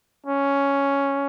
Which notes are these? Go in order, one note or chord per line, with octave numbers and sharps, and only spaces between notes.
C#4